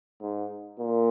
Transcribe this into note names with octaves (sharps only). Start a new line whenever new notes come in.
G#2
A#2